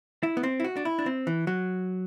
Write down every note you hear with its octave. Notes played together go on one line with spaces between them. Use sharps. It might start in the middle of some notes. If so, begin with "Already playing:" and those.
E4
B3
C4
E4
F#4
D4
E4
D4
C4
E3
F#3